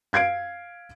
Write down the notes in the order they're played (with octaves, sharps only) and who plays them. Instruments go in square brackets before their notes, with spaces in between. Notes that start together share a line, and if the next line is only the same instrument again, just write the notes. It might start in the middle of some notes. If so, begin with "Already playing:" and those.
[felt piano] F5 G#6 C7 D7